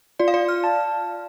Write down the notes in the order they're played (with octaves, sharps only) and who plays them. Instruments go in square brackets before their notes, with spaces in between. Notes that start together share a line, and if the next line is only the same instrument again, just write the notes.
[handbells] F4 [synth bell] D5
[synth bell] F5
D5
F6
[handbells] A5